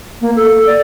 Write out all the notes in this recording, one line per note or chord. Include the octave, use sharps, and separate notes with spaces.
A#3
A4
D5